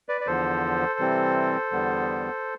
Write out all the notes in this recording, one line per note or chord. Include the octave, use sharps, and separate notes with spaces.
B4 D5
D5
E2 D3 F3 A4 C5
C3 E3 G3 C4
E2 D3 G3 B3